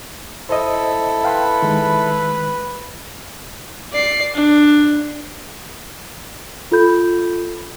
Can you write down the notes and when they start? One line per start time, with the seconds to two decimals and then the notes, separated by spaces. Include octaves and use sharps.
0.49 E4 A4 C5 D#5
1.24 B4 F5 G5 C6
1.62 D#3 G#3
3.92 D5 C7
4.34 D4
6.72 F4 A4 B5 G6